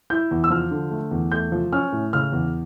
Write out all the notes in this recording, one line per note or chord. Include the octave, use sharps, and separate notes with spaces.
E4 G6
E2
E6
F3 F6
D3
A3
E2
A3 G6
F3
C#4 F6
A2
C#3 F6
E2